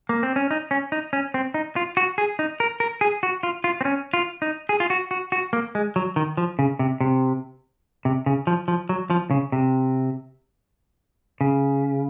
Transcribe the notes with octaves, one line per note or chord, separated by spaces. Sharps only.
A#3
C4
C#4
D#4
C#4
D#4
C#4
C4
D#4
F4
F#4
G#4
D#4
A#4
A#4
G#4
F#4
F4
F4
C4
C#4
F4
D#4
G#4
F4
F#4
F#4
F#4
A#3
G#3
F#3
D#3
F3
C#3
C3
C3
C3
C#3
F3
F3
F#3
F3
C#3
C3
C#3